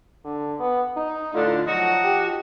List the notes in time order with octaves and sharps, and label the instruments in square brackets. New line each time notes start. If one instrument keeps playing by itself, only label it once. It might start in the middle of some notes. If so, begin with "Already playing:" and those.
[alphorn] D3
B3
D#4
[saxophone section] A2 D3 [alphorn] F4
[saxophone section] F3 D#4 F#4 [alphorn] F#3
[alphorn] G4